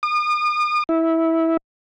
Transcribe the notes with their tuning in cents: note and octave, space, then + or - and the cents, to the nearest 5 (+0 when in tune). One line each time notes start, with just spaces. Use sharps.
D#6 -40
E4 -15